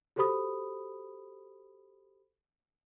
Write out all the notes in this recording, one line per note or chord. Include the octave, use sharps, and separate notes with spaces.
F#4 G4 A4 C5 B5 D#6